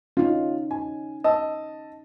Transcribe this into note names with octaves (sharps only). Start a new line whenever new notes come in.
C#4 D#4 F4
G#5
D#5 A5 E6